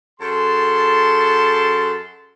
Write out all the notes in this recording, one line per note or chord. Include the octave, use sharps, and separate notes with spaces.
F#2 G#4 A4 A5 C6